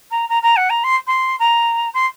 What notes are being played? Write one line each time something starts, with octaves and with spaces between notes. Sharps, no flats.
A#5
A#5
A#5
F#5
A#5
C6
C6
A#5
C6